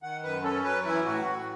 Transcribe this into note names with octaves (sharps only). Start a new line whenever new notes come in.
D#3 F#5
F#2 B4
C#4 A4
F#3 B4
E3 E4
A2 F#4
A2